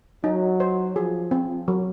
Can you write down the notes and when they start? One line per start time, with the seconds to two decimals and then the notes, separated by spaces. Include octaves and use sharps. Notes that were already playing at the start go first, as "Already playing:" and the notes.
0.24 F#3 D#4
0.60 C5
0.96 F3 G#4
1.31 C4
1.68 F#3